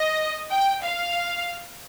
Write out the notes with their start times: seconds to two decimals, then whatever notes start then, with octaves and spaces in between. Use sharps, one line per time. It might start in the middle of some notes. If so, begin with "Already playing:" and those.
Already playing: D#5
0.51 G5
0.83 F5